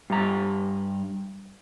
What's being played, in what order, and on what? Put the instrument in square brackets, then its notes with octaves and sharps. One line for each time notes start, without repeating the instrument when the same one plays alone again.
[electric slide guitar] G2 A#5